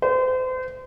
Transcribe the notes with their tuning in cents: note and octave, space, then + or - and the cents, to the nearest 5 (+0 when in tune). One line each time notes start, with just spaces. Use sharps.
C5 -35